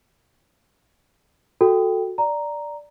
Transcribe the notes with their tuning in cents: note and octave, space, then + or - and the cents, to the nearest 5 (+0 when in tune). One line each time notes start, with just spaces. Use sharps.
F#4 -10 A4 +0 G5 +0
D5 +0 A#5 +0